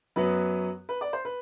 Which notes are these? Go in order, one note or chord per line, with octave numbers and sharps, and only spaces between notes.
F#2 F#3 B3 B4
B4
D5
C5
B4